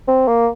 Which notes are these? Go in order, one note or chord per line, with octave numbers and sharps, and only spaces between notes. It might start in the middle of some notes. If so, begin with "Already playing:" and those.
C4
A#3